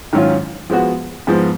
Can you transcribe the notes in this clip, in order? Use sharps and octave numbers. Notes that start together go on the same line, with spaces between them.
G#2 D#3 F#3 C#4 F4
F3 G#3 B3 F#4
G#2 F3 G#3 B3